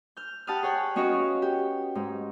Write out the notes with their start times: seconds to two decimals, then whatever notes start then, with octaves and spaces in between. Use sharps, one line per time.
0.17 F6 G6
0.47 G4 F#5 A5 B5 D#6 F6
0.63 G#4 C#5 F#5 G5
0.96 B3 C#4 F#4 C#5 D#5 F5
1.42 G4
1.95 G#2